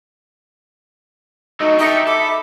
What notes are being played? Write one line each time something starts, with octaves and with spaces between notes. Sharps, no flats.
F#3 A3 D#4 D#5
D#4 G4 A4 E5 C#7
A4 B5 D6